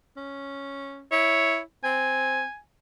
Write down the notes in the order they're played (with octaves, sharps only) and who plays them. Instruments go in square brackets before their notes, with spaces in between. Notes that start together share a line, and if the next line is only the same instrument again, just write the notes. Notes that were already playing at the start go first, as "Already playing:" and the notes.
[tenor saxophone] C#4
[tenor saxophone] E4 [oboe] C#5
[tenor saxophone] C4 [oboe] G#5